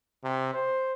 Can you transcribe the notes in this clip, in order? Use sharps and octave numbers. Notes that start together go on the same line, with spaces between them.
C3
C5